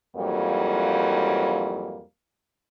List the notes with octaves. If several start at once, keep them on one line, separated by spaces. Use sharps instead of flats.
F2 G#2 E3 F#3 G3 A#3